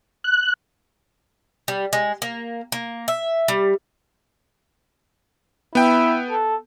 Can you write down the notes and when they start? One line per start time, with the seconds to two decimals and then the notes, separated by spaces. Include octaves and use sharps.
0.24 F#6
1.68 G3
1.93 G#3
2.22 A#3
2.72 A#3
3.08 E5
3.48 G3
5.75 B3 E4 G5
6.30 A4